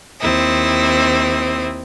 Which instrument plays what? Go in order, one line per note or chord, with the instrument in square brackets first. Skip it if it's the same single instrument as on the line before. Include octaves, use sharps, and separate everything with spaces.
[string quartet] D#2 C4 E4 D#6